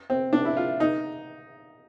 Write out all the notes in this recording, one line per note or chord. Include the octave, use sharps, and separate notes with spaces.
C4
D4
E4
F4
D#4